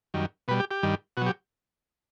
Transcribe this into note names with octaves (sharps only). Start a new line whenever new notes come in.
F#2 D#3 G3
B2 G3 B4
G4
G4
G2 D#3 G3
B2 F#3 F#4
G4